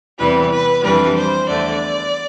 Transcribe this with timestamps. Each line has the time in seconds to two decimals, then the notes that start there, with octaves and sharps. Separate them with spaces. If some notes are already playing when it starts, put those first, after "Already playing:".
0.18 E2 C3 E3 G3 B4
0.51 B4
0.83 F2 E3 G3 D4 B4
1.16 C5
1.48 E2 D3 A3 D5